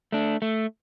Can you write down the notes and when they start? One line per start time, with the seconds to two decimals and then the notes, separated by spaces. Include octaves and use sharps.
0.12 A3 D4
0.42 A3